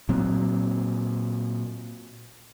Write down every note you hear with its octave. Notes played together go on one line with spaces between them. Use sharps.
A#2 F#3 C4